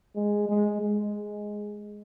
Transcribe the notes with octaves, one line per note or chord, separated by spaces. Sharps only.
G#3
G#3
G#3